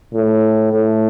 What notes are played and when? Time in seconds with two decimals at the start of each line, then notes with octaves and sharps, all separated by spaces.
0.14 A2
0.71 A2